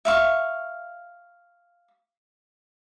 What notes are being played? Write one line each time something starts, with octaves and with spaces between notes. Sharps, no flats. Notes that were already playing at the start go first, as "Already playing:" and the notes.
E5 F5 C#6